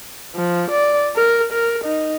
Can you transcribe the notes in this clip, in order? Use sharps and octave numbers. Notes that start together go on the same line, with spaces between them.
F3
D5
A#4
A#4
D#4